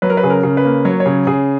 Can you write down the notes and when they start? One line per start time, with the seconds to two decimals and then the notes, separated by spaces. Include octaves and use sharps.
0.02 F#3 B4
0.10 A#4
0.17 B4
0.23 C#3 G#4
0.30 A#4
0.43 C#3
0.57 B4
0.65 A#3
0.85 F#3 C#5
1.00 C#5
1.06 C#3
1.27 C#3 G#4